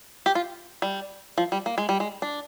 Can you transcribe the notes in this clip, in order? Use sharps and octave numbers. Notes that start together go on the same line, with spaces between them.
G4
F4
G3
F3
G3
A#3
G#3
G3
G#3
D4